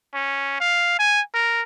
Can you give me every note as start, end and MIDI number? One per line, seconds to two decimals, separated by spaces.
0.14 0.60 61
0.60 0.98 77
0.99 1.21 80
1.34 1.63 70